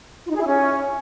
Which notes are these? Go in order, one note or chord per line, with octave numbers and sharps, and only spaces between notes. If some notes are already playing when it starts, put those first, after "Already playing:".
F4
D#4
G#4
E4
C#4